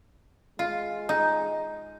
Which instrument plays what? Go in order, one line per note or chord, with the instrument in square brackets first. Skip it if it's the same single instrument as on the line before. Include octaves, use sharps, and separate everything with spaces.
[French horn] G#3 [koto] F4
[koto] D#4